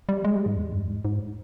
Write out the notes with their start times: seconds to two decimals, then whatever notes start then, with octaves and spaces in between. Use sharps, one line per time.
0.09 G3
0.24 G#3
0.36 G3
0.46 G#2
0.57 E2
0.73 G2
0.88 G#2
1.05 G#2